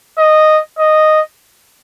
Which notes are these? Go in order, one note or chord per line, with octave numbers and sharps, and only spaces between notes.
D#5
D#5